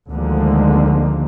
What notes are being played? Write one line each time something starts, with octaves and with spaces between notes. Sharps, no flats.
D2 D3 D#3 F3 G#3 A#3